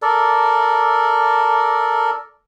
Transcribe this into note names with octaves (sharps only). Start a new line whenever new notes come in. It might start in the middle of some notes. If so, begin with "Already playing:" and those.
A4 A#4 D5